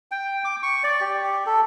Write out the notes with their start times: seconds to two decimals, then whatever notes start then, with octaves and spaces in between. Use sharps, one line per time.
0.11 G5
0.45 D6
0.63 C#6
0.84 D5
1.01 G4
1.46 A4